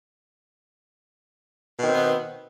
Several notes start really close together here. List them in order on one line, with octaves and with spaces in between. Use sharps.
B2 D#3 C4 B3